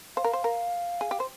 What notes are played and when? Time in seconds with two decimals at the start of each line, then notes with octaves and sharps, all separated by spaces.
0.17 C5 F5
0.24 A#4
0.33 C5
0.44 A#4
1.01 G#4
1.11 G4
1.20 C5